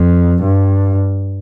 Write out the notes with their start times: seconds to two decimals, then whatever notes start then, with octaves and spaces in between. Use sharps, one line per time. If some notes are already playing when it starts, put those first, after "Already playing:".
Already playing: F2
0.43 G2